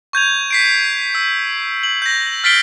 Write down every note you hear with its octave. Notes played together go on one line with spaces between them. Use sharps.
C#6 G6 G#6 F7
B6 C7 D7
E6
F#7
G6 A#6
F6 A6 B6 C7 D7 G7